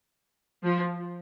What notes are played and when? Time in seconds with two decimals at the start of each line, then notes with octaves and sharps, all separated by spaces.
0.64 F3